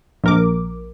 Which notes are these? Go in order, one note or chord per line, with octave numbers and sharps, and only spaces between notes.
A#1 A#4 D6